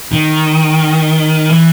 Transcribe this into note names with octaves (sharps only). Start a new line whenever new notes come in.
D#3
E3